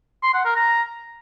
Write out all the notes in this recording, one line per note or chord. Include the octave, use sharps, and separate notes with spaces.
C6
F#5
A#4
A#5